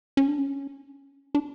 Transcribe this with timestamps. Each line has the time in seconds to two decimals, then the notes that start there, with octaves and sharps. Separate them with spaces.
0.17 C#4
0.28 D4
0.39 C#4
1.35 D4